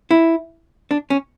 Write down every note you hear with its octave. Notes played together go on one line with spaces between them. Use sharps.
E4
D4
C#4